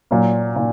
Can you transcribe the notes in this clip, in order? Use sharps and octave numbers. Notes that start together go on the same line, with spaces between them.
A#2 F#3 A#3
A#2